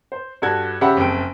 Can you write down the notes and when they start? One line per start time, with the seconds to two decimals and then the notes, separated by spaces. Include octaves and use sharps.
0.12 C5
0.42 G2 F#4 A4 G#6
0.81 C#3 G4 C#5 E5 F#5 B5
0.97 F#1 F2 G5 D7